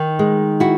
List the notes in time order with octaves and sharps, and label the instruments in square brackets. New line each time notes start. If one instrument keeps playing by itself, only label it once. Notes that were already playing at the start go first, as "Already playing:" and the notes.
Already playing: [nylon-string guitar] D#3
G#3
E4 F#4